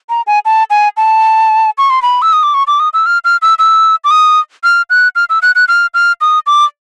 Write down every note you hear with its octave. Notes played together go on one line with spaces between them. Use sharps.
A#5
G#5
A5
G#5
A5
C#6
C6
B5
E6
D#6
D6
C#6
D6
D#6
E6
F6
F6
E6
E6
D6
D#6
F6
F#6
F6
E6
F#6
F#6
F6
F6
D#6
D6